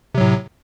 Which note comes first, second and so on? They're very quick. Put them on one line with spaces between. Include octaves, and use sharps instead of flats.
C3 F#3 A2